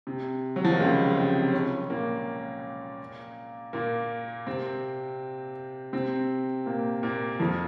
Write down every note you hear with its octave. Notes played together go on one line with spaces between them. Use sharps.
C3
F#3
F3
D#3
C#2 C#3
C3 C4
C#3 C#4
A#2 A#3
A#2 A#3
C3 C4
C3 C4
A#2 A#3
A#2 A#3
F2 F3